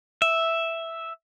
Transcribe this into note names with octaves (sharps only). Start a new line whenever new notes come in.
E5